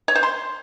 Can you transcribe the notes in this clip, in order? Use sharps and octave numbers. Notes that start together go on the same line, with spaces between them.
C#5
C5
C6